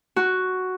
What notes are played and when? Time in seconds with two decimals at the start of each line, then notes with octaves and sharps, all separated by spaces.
0.16 F#4